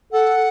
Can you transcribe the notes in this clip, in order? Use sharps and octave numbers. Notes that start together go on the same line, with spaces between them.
A4 F#5